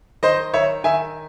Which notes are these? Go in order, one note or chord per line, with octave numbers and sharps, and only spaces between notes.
D#3 C5 D#5
D#3 C#5 E5
D#3 E5 G#5